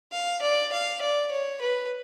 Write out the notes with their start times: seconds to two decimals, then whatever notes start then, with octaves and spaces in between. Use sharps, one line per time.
0.12 F5
0.42 D5
0.72 F5
1.01 D5
1.32 C#5
1.61 B4